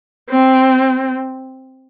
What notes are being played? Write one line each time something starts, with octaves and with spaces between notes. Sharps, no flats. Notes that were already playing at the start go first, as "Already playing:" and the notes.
C4